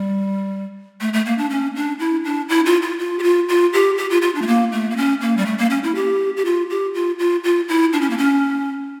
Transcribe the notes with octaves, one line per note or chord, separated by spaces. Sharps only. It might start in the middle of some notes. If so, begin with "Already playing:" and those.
Already playing: G3
A3
A3
A#3
D4
C#4
D4
E4
D4
E4
F4
F4
F4
G4
F4
F4
G4
G4
F4
F4
D4
A3
A#3
A3
A#3
C#4
A#3
G3
A3
A#3
C#4
E4
G4
G4
F4
G4
F4
F4
F4
E4
D4
C#4
A#3
C#4